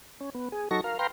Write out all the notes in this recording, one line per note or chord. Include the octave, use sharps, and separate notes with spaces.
C#4
B3
G#4
F#3 D#4 F#4 A4 C#6 A#6
A#4 F5
B4 F5 G5 A#5 C6